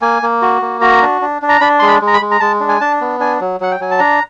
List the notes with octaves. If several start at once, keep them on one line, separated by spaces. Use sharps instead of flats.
A#3 G#5
A#3
F#4
A#3
F#4 A#5
D4
D4
D4
A#5
D4 B5
G#3 C6
B5
G#3
A#5
B5
G#3
A#5
G#3 A5
D4
G#5
D4 A5
B3
D4 G#5
F#3
F#3 F#5
G5
F#3 G#5
A5
D4 A#5